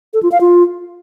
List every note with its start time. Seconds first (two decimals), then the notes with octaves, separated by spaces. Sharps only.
0.14 A4
0.23 F4
0.32 F5
0.41 F4